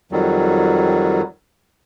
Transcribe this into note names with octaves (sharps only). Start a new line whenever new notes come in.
F2 D#3 F#3 G3